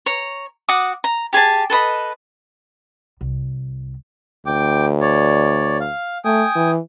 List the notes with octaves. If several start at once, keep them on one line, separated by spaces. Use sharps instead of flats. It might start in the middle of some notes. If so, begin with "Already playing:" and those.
C#5 A#5
F#4 F#5 D6 D#6
A#5
G4 G#4 G#5 A5
A4 B4 D#5 B5
C2
D2 G5 D6
C#5 D5
F5
A3 G5 G#5 D#6
E3